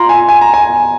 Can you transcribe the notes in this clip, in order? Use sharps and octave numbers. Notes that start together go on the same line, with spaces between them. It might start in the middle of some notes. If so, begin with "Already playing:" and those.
Already playing: F4 A#5 C6
G#5
G#5
A#5
G#5